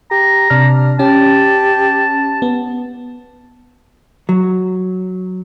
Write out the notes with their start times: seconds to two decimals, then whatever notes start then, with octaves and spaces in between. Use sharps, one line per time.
0.11 G4 A#5
0.50 C3 D4 F6
0.99 C#4 G4 A5
2.42 B3
4.29 F#3